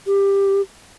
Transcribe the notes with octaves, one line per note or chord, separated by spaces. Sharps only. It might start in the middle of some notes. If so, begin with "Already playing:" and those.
G4